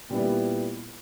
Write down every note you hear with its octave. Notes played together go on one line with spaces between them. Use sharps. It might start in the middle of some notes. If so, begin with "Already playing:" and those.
A#2 G3 B3 E4